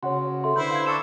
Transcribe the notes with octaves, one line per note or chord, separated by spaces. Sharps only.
C#3 F#4 C#5 F#5 C6
A4 E5 C6
D3 E4 B4 C5 G6
F5 G#6
D4 A4 C#6 C#7 E7